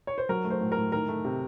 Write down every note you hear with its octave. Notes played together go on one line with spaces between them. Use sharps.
C#5
C5
F#3 A#4
A3
C5
A2
A#4
A2
D#3 A#4
A3
C3